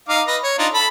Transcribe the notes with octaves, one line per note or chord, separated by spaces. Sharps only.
D#4 F5 D6
B4 D#5
C#5
D4 D#4 F4
A4 B5